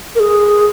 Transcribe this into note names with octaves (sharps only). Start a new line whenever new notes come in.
A#4
G#4